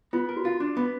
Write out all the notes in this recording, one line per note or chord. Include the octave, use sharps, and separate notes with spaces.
B3 F4
A#4
F#4
F4
D4
B3